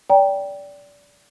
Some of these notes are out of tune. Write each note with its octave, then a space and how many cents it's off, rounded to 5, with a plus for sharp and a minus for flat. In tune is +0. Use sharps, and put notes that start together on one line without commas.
D5 -25 G5 +0 A#5 +15